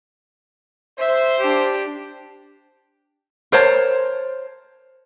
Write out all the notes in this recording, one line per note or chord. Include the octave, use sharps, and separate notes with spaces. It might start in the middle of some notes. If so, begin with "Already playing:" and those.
C5 E5
D4 G4
A#4 C5 C#5 A5